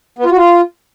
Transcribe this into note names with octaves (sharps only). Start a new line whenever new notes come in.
B3
F4
F#4
F4